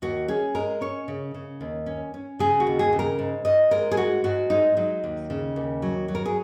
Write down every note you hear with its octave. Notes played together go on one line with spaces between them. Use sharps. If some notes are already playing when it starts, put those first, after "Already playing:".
D#2 F#4
C#4 G#4
G#3 A#4
C#4 C#5
C#3
C#3
D#2
C#4
C#4
C#3 G#4
F#4
D#2
G#4
C#3
A#4
G#2
G#2 D#5
G#3 A#4
G#4
G#2 F#4
G#2 F#4
G#3 D#4
F#3 D#4
D#2
C#3
D#2
F#3
F#3
A#4
G#4